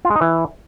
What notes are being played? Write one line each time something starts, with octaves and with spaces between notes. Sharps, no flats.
F4
G#3
D#4
E3